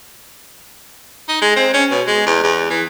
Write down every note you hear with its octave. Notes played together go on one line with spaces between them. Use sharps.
D#4
G#3
C4
C#4
B2
G#3
E2
E2
E3